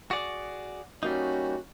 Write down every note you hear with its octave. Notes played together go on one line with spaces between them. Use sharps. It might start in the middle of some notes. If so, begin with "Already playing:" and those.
F#4 G#4 D5
G3 A#3 C#4 D#4 F#4